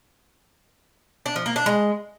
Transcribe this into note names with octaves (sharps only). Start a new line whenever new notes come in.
D4
F3
A#3
D4
G#3